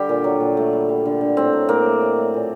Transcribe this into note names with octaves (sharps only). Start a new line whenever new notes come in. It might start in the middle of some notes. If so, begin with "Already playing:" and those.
Already playing: D3 G3 G4
A#2
F#3
A#2
A3
G3
G3
D3
D3
A2 C4
F#3
A2 A#3
A3
A3
A3
A#2